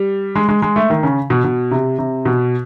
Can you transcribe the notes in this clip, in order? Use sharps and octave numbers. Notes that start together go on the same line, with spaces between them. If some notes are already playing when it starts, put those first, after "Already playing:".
Already playing: G3
G#3
G#3
G#3
A3
D#3
C#3
B2
B2
C3
C3
B2